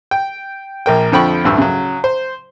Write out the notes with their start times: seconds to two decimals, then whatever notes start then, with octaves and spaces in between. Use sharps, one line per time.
0.11 G5
0.86 A#1 A#3 G5
1.12 F2 D3 F3 G5 B5 C#6
1.45 A1 D2 G2 E6
1.58 C#3 F#3
2.04 C5